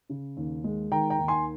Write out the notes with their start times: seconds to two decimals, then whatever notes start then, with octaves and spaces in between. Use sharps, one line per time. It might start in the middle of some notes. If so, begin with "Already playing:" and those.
0.10 C#3
0.37 D#2
0.64 G#3
0.92 D#3 G5 A#5
1.10 G5 A#5
1.19 D#2
1.28 G#5 C6